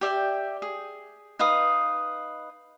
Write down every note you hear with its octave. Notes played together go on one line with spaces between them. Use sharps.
G4 D5 E5 G5
G#4
D#4 B4 F5 D#6